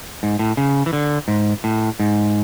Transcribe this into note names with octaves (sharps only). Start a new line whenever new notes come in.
G#2
A2
C#3
E3
D3
G#2
A2
G#2